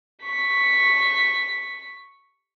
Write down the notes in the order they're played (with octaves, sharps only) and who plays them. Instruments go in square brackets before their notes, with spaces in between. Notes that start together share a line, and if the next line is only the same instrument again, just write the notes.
[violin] C#6 B6